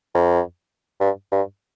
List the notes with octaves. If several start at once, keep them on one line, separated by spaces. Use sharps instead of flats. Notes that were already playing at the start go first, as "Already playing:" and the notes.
F2
G2
G2